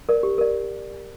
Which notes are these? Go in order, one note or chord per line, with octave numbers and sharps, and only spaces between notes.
A#4 D5
G4
A#4 D5